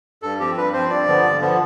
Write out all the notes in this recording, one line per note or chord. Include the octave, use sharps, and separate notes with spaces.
G2 A4
F3 C4 G4
G2 B4
F3 C4 C5
G2 D5
D3 F3 B3
G2
D3 F3 B3